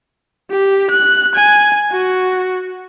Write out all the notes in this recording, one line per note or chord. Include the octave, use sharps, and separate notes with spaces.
G4
F#6
G#5
F#4